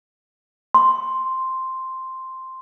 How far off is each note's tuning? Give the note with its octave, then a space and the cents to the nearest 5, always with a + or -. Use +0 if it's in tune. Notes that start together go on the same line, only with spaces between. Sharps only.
C6 +0